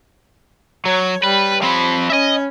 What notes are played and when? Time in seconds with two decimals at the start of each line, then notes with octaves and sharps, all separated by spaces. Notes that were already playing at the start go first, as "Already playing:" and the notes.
0.85 F#3 C#5
1.24 G3 B4
1.62 F3 C4 B5
2.10 C#4 D#5 E5